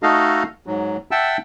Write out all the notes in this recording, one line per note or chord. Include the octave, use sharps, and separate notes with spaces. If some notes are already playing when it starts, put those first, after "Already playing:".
A3 D#4 F#4 A4 D#5 F5
G#2 F#3
E5 F#5 G5 A5 E6